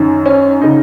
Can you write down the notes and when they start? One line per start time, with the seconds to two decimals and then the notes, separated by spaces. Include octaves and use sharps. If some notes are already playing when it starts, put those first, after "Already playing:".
Already playing: F#2 D#3
0.26 C#4
0.62 C#3 D#4